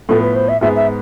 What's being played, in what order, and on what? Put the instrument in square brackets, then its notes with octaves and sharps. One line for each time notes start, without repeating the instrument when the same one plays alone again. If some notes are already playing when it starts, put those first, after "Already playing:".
[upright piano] A2 F3 B3 [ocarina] A4
[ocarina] B4
C5
E5
[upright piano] G#2 G#3 B3 [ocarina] E5
[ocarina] E5